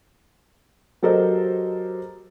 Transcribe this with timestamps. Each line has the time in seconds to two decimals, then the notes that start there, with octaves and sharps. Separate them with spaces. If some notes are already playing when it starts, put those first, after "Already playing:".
1.03 F#3 G4 A4 A#4 C5 D#5